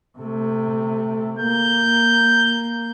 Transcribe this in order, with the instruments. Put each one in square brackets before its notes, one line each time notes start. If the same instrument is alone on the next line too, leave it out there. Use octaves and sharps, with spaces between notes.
[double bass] C3 A3
[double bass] A#3 [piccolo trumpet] G6